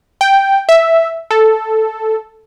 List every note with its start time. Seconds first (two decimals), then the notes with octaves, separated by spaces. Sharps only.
0.21 G5
0.69 E5
1.31 A4